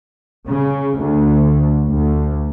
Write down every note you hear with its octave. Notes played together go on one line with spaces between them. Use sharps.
C#3
D2
D2